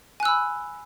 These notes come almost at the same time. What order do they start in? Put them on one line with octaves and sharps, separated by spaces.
G#5 F#6 E6 B5